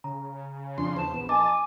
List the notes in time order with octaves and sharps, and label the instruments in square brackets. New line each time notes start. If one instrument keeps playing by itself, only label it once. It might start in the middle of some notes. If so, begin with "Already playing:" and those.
[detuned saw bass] C#3 [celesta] A#5
[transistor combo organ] F2 D4 C6
[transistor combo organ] E2 C5 [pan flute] A5
[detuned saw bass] A#1 [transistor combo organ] B3
[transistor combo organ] D#5 A5 [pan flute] G#5 [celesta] D6